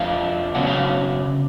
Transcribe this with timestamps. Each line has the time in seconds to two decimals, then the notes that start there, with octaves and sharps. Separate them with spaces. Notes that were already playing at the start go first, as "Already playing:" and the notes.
Already playing: F2 F3 A3 D4 F5
0.55 C#3 F#3 B3 D4 F#5
0.67 F5